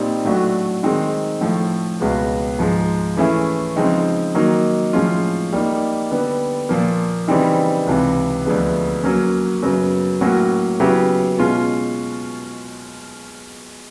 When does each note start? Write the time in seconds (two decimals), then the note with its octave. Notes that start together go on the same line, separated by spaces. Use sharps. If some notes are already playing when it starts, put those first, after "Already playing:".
Already playing: A#2 G3 C4 D#4 G4
0.25 A2 F#3 A3 D4 F#4
0.83 D#3 G#3 C4 D#4
1.41 A2 F3 A3
2.00 C#2 B2 G#3 B3
2.59 G#2 F3 G#3
3.17 E3 A3 C#4 E4 G#4
3.76 C#3 F3 G#3 C4 D#4
4.35 D#3 F#3 A#3 D#4
4.93 A2 F3 G#3 C#4 F4
5.52 G3 A#3 D#4
6.11 D3 G3 B3
6.69 A#2 F3 A#3
7.28 C#3 E3 G3 C4 D#4
7.87 C#2 C3 E3
8.45 D2 D3 F3 G#3 B3
9.03 F#3 A#3 C#4
9.62 F#2 C#3 F#3 B3
10.21 A2 F#3 A#3 C#4 F#4
10.80 C#3 F#3 B3 E4 G4
11.38 B2 G#3 C#4 F4